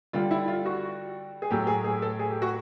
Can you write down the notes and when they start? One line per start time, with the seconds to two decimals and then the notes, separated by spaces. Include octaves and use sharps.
0.13 D3 G3 F4
0.31 E4
0.48 F4
0.66 F#4
1.42 G#4
1.51 A2 F#3 A3 G4
1.67 G#4
1.84 G#4
2.02 A4
2.19 G#4
2.30 G4
2.42 F#4